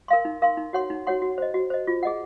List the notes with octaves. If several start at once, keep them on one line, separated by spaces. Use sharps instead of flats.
A#4 F5 C6
D#4
A#4 F5 C6
D#4
F#4 C#5 F#5 C6
D#4
F#4 C#5 F#5 C6
F#4
C5 D#5
F#4
C5 D#5
F4
G#4 D#5 F#5